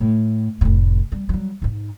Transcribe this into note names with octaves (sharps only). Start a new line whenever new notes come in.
A2
F1 A2
G3
F#3 G3
G#2 D#4